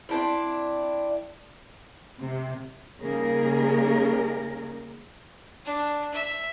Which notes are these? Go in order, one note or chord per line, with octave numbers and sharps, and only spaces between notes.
C4 D4 E4
C3
C#3 G3 A#3 D#4 G#4 A#4
D4
E5